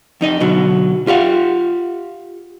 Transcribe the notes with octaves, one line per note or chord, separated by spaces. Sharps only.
F2 D#4 D#5
B2 D3 F#3
F4 G4 F5 F#5